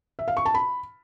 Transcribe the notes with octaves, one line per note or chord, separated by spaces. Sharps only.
E5
F5
C#6
A5
B5